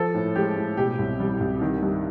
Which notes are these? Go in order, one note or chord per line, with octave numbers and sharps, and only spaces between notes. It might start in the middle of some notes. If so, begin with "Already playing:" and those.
Already playing: F3 A4
A2
G#3 G4
A2
B2 G4
C2
G3
C2
D#3
G2